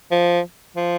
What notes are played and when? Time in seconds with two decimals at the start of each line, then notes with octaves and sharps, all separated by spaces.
0.11 F3
0.76 F3